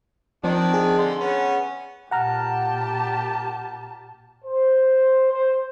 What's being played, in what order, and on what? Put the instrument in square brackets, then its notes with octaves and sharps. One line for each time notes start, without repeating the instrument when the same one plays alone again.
[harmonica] D#3 D4 [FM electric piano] F3 C4
[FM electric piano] G#4
[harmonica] D3 C6
B3 C#4
[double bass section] A#2 [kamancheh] G4 A5 [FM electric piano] F#5 A#5 F6
[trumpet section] C5
C5